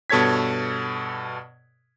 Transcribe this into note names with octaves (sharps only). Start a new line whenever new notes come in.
G2 B2 A4 C#5 G#6 B6